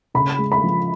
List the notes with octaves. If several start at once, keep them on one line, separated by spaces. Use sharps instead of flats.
C#3 B5
G#3
B5
F3